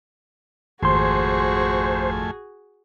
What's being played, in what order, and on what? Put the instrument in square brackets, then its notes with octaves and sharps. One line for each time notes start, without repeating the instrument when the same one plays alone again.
[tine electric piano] G#1 C6 [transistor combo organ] F2 A3 G#5 [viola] F#4 G#4 [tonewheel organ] C5